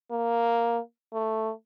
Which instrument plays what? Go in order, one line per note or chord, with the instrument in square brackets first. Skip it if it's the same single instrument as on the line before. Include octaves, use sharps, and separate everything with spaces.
[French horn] A#3
A3